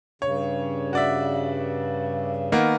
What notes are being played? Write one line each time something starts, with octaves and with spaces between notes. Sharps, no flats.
G2 C#3 C#5
F#4 D5 E5
D#3 A#3 B3